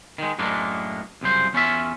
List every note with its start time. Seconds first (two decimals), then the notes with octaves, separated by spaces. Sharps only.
0.18 D#3 G#3
0.38 F#2 A2 G#3 A#3 D4
1.21 C2 F#2 C#3 C5
1.53 E2 C#4 F4 E5